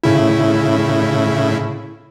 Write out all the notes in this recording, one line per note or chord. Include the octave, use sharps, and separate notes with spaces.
A2 C#3 E4